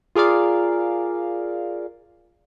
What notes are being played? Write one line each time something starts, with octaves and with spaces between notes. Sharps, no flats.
F4 G#4 A#4 D5 F5